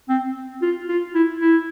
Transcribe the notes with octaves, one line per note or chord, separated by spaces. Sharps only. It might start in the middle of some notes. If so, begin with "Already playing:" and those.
C4
F4
F4
E4
E4